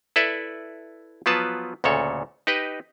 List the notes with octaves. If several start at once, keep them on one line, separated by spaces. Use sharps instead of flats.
E4 A4 B4 D5 E5
F3 F#3 B3 F4 B4 A5
D2 A#2 C#3 A4 C#5
D#4 G4 B4 D#5